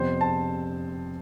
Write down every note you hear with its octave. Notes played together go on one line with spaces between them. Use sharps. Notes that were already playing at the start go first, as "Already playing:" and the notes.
Already playing: F2 C3 G3 B3 C5
A5